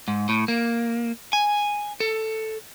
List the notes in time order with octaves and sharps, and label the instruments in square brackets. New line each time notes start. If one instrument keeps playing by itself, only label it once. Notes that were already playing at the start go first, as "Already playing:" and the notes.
[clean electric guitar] G#2
A2
A#3
G#5
A4